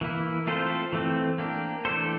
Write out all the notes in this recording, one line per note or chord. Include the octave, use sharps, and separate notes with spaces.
E3 A#3 E4
A3 C4 F4 A4 C5
E3 A3 C4
A#3 D4 G4
E3 A3 D4 A4 C5